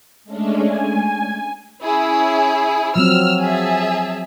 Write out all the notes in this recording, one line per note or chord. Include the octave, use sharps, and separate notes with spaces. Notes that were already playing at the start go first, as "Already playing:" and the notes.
G#3 A3 C#4 D4
G#5
C#4 E4 G#4
F3 F#3 C4 E6 F6
G#4 E5 A5